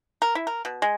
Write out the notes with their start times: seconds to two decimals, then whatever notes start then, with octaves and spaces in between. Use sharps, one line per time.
0.22 A#4
0.35 E4
0.47 A#4
0.65 B2
0.82 G#3